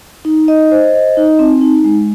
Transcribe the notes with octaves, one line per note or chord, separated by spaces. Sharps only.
D#4
D#5
C5
D#5
D#4
C4
D#4
G#3